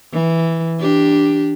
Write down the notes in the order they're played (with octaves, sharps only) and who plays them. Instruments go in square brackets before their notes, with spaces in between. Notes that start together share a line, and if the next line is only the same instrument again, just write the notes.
[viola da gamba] E3
D4 G4